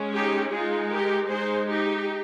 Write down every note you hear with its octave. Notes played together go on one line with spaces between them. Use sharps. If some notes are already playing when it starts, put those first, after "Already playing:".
Already playing: G#3 C#4
D#4 G4
G#3 D#4 F4 G#4
G4 A#4
G#3 D#4 G#4 C5
D#4 G4